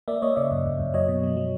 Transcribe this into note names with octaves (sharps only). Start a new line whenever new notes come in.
A#3 D5 E5
A#3 C#5 D#5
C#3 D5 E5
F#2
F#2
F#2
F#3 C#5 D#5
B2
F#3
F#3